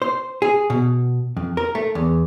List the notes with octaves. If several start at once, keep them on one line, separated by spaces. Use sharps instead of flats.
C5
G#4
B2
F2
A#4
A3
E2